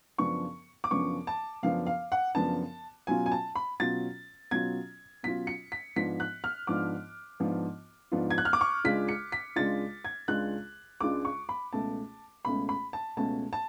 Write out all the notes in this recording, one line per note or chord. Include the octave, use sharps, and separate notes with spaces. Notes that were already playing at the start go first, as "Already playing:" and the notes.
F#2 C#3 F3 B3 D4 C#6
D6
F#2 C#3 F3 B3 D4 C#6
A5
F#2 C#3 F3 B3 D4 F5
F5
F#5
F#2 C#3 F3 B3 D4 A5
B2 F#3 C#4 F4 G#5
G#5
A5
B5
B2 F#3 C#4 F4 A6
B2 F#3 C#4 F4 G#6
B2 F#3 C#4 F4 B6
C#7
B6
G#2 F3 B3 D4 F4 B6
F#6
F6
G#2 F3 B3 D4 F4 D6
G#2 F3 B3 D4 F4
G#2 F3 B3 D4 F4
G#6
F#6
F6
D6
C#6
C#2 C#3 G#3 D4 F4 B6
C#7
B6
C#2 C#3 G#3 D4 F4 A6
G#6
C#2 C#3 G#3 D4 F4 F#6
C#2 C#3 G#3 D4 F4 D6
C#6
B5
C#2 B2 A3 C#4 A5
C#2 B2 A3 C#4 B5
B5
A5
C#2 B2 A3 C#4 A5
A5